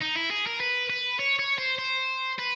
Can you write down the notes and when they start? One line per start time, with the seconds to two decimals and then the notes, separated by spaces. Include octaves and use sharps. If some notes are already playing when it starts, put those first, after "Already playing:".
0.02 D#4
0.16 E4
0.31 G#4
0.46 A#4
0.60 B4
0.90 B4
1.19 C#5
1.39 C#5
1.59 C5
1.79 C5
2.38 B4